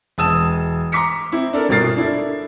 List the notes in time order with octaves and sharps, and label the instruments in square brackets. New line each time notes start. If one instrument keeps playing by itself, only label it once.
[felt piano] E1 A5 D#6 E6 E7
A#5 C6 D6 B6 C#7
C4 E4
D4 A4 A#4
G1 B2 A#4 A6 C7
D4 E4 A4